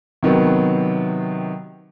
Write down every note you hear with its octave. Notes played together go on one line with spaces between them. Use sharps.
C3 D#3 F#3 B3